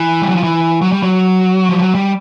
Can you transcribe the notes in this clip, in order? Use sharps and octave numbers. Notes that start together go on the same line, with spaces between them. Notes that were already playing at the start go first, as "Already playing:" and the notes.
Already playing: E3
G3
F#3
F3
E3
F#3
G3
F#3
F3
F#3
G3